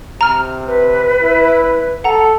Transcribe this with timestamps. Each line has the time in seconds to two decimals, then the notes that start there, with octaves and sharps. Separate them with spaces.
0.21 C3 A#5 F6
0.67 B4
1.21 E4
2.04 A4 F#5 A#5